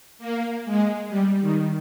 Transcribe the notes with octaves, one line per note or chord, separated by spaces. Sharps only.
A#3
G#3
G3
D#3